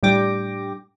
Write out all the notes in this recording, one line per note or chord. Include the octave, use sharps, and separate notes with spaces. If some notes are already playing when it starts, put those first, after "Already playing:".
A2 G3 D4 G5 D6 A#6